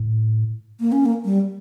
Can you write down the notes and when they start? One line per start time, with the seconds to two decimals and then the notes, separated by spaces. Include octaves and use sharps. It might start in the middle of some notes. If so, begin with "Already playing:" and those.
Already playing: A2
0.80 A#3
0.92 C#4
1.06 A#3
1.25 G3